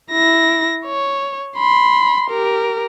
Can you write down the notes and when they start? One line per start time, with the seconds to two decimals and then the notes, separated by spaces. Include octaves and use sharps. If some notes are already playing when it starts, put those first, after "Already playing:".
0.12 E4 A#6
0.86 C#5
1.57 B5 C6
2.30 G4 A#4